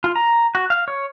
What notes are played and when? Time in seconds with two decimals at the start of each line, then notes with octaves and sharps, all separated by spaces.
0.04 F4
0.16 A#5
0.55 F#4
0.70 F5
0.88 C#5